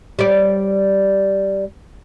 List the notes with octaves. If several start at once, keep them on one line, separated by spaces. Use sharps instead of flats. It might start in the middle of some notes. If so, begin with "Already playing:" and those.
G3 D5